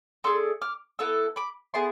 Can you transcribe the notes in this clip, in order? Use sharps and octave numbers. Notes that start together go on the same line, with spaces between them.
A3 D4 G#4 C6 E6
D6 F6
B3 E4 A4 E6
B5 D6
B3 E4 G#4 A5 C6